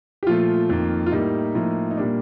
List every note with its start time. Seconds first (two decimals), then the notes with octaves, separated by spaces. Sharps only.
0.23 G4
0.27 A#2 F3 A3 F4
0.69 F2 D#3 A#3
1.06 F4
1.12 A2 G3 A#3 D#4
1.55 A2 F3 A#3
1.91 D#4
1.97 A#2 G3 A#3 D4